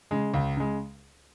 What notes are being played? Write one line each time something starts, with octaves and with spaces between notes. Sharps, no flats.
C#3 G#3
C#2
C#3 G#3